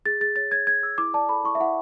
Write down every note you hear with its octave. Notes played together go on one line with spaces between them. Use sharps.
G#4 A6
G#4 A6
C#5 A6
C#5 G#6
G#4 G#6
G#4 E6
E4 D6
D5 A5
A4 B5
E4 C#6
E5
E4 F#5